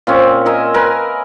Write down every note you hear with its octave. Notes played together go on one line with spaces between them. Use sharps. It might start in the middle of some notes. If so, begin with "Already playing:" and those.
A#2 C4 C#4
A#4 D#5 E5 G#5
A#4 B4 G#5